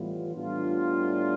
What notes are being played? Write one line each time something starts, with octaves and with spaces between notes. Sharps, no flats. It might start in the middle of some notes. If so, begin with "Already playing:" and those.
Already playing: A2 E3 G3 B3 F4
A2 G3 B3 D4 F4